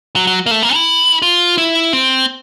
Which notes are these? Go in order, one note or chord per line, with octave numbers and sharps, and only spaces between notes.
F#3
F#3
A#3
A3
A#3
E4
F4
E4
C4